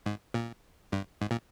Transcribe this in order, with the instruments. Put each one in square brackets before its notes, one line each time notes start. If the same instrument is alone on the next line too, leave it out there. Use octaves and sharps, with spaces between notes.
[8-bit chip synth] G#2
A#2
G2
G#2
A#2